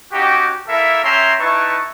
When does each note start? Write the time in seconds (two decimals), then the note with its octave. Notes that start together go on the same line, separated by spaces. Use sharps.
0.13 C#4 D#4 F#4 G4
0.68 A#3 E4 A4 A#4 E5
1.04 C#4 C#5 E5 G5 A#5 C6
1.40 D#4 E4 B4 A5 C#6